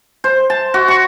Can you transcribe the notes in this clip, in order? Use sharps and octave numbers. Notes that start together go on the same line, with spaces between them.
C5
A5
F#4
C#6